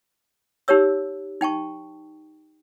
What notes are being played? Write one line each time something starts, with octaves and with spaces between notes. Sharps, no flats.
D#4 G4 A#4 C#5 E6
D#4 G5 A5 C#6